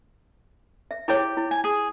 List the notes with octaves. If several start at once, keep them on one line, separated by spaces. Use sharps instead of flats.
E5
E4 G4 G#4 C#5 G5
E4
G#5
G#4